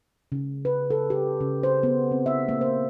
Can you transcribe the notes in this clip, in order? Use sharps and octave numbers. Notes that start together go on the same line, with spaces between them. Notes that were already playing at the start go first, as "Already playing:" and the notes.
C#3
B4
A4
G4
C#3
C5
B3
C4
E5
A#3
C5